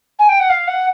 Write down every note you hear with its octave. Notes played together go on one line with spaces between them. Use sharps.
G#5
G5
F#5
F5
F#5